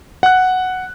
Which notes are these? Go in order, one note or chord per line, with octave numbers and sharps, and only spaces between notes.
F#5 F#6